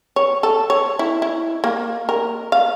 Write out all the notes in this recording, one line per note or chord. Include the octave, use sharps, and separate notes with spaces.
C#5
A4
C#5
E4
E4
A#3
A#4
F5